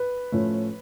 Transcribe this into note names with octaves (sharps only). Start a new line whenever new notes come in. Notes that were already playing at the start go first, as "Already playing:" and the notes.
Already playing: B4
A2 F3 A3 C#4